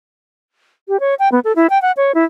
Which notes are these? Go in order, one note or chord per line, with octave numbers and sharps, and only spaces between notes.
G4
C#5
G5
B3
A4
E4
G5
F#5
C#5
E4